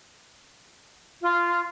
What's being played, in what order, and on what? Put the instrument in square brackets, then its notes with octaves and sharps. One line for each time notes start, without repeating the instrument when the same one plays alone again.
[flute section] F4